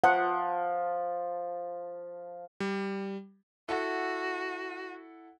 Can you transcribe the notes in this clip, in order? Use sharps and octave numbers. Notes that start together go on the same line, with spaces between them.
F3 F#5
G3
E4 F#4 A4 F#5